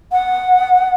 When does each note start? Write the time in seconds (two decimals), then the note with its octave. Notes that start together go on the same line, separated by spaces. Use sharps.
0.12 F#5